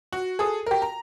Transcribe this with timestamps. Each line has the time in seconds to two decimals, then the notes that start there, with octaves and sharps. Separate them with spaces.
0.12 F#4
0.39 G#4 A4 D#6
0.66 G4 A#4
0.82 A#5